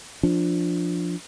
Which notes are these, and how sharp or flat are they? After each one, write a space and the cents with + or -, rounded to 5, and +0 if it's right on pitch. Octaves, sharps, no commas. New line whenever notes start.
F3 +0 D4 +0